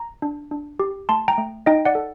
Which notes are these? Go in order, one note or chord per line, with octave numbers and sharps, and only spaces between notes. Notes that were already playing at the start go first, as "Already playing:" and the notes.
Already playing: A#5
D4
D4
G4
A3 A5 C6
G5 A#5
A3
D#4 D#5 G5
D5 F#5
A4